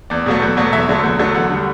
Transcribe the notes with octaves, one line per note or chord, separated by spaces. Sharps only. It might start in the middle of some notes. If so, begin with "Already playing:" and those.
E2 D5
B2 F#3 A3
E2
B2 F#3 A3
E2 E5
D3 F#3 A3
E2
D3 F#3 A3
E2 F#5
D3 G3